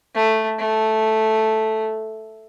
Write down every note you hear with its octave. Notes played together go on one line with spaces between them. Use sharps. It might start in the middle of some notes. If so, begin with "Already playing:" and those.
A3
A3